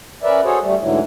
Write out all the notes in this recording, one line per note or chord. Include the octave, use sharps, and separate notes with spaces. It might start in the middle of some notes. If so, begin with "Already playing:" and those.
C#4 A#4 B4 D5 E5
F#4 G#4 A4 C5 C#5
D2 G3 A3
D2 G#2 D3 E3 F#3